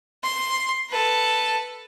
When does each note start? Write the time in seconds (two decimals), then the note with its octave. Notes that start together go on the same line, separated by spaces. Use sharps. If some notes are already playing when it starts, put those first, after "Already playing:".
0.23 C6
0.90 A4 B4